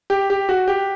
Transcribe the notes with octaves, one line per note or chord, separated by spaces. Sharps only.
G4
G4
F#4
G4